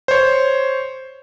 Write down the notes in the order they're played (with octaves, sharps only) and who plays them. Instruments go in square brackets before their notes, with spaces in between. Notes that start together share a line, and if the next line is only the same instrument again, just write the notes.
[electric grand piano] C5 C#5